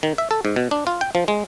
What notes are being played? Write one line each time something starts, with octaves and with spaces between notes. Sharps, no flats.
D#3
E5
A4
G#2
B2
D4
F4
G5
F3
G#3